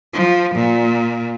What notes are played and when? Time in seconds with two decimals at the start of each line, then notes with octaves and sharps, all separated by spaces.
0.14 F3
0.55 A#2